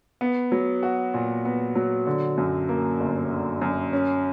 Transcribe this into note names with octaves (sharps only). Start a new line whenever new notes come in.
B3
F#3
F#4
A#2
B3
F#3
D3
F#2
A#3
G1
D3
F#2
C#4